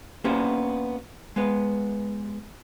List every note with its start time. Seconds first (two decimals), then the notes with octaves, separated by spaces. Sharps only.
0.24 A#3 B3 C#4 D4 G4 C5
1.36 G#3 B3 B4